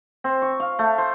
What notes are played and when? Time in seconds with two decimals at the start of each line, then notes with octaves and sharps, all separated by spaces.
0.24 C4
0.42 C#6
0.60 F5
0.79 A3
0.98 C5